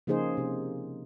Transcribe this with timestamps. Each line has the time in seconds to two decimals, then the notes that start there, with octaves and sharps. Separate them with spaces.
0.07 C#3 F3 A#3 D#4 G#4 C5
0.37 C3